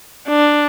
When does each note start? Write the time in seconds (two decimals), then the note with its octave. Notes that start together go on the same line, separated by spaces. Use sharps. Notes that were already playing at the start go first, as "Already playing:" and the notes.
0.29 D4